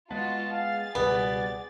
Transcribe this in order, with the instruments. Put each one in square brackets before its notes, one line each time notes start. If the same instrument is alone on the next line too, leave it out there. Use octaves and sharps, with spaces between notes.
[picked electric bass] G#3 B3 [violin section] F4 F#4 D#5 [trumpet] A5
[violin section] G#4 A6 [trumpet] F5
[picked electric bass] C#2 B2 G3 [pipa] B3 [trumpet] D5